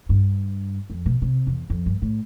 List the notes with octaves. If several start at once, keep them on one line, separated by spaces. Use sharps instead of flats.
G2
F2
B2
C3
E2
F2
G2
A2